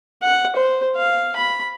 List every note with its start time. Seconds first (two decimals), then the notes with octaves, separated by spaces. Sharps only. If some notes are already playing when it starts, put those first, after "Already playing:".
0.22 F#5
0.56 C5
0.97 F5
1.36 B5